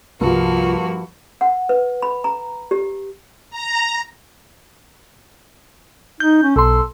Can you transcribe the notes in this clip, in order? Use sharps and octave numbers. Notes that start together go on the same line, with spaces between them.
C2 G2 F3 A#3 F4 F#4
F#5
B4
B5
A#5
G4
A#5
D#4 G6
C#4
B1 A4 C6